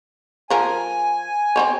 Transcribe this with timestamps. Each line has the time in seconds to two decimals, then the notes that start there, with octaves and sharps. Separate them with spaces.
0.50 F3 A#4 G#5
1.56 C4 C5 C#5